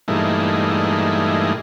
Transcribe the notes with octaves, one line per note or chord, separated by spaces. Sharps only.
G2 A#2 E3 G#3 A3 D#4